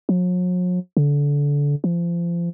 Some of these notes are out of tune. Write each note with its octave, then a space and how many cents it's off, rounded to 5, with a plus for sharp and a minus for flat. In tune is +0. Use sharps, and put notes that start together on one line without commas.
F#3 -45
D3 -25
F3 -30